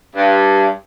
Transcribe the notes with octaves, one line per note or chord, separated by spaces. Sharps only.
G2